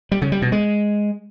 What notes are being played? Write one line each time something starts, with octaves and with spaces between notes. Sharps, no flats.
G3
C#3
G3
B2
G#3